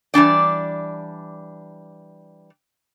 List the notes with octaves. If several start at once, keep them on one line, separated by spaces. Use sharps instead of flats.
E3 G3 D4 D5